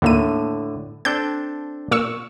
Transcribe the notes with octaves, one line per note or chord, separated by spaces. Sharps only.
D#2 A2 D3 A#3 D#7
C4 D4 A4 G6
A#2 C#6 E6